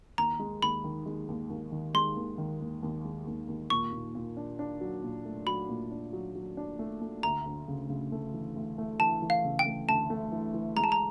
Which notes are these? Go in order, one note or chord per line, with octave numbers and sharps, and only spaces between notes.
D#2 A#5
G#3
D#2 B5
D#3
G#3
D#2
D#2
D#3
G#3 C6
D#2
D#3
D#2
D#2
G#3
D#2
D#2
A#2 C#6
A#2
A#2
D4
D4
F#3
A#2
A3
F#3 B5
A#2
D4
F#3
F#3
D4
A3
A3
D2 A#5
D2
C#3
C#3
A3
E3
D2
A3
E3 A5
E3
F5
C#3
G5
A3
D2 A5
A3
E3
E3
G#3 A#5
A5
A#5